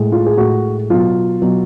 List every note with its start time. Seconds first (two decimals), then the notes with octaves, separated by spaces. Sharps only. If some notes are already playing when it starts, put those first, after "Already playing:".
Already playing: A2 G#3
0.12 F4
0.26 G#4
0.38 A2 G#3 F#4
0.90 B2 F#3 F4
1.42 B2 F#3